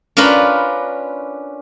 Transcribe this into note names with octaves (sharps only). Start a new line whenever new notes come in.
C#4 D4 F4 A#4 B4 B5